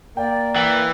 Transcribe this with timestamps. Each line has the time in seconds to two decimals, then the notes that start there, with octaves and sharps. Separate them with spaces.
0.17 A#3 D5 G5
0.56 E3 G5 F#7